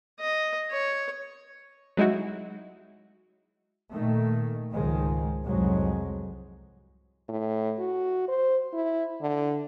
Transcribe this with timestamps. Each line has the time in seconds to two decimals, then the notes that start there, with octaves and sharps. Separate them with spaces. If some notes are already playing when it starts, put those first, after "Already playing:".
0.20 D#5
0.71 C#5
1.97 F#3 G#3 D#4 E4 F#4
3.92 A#2 D#3 A3
4.70 C#2 G#2 D#3 F3 G#3
5.44 C2 F2 G#2 F#3 G#3
7.29 A2
7.79 F#4
8.28 C5
8.73 E4
9.21 D3